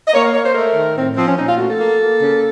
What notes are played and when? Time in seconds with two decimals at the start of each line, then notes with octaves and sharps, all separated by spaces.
0.07 D#5
0.14 A#3 C#5
0.23 F5
0.33 A#3 C#5
0.44 C5
0.55 A3 A#4
0.75 D#3
0.95 A2 C4
1.16 F3 C4
1.27 C#4
1.37 A#2 D#4
1.48 F4
1.58 A3 F#4
1.69 A4
1.78 A#3
1.99 A#3
2.20 C#3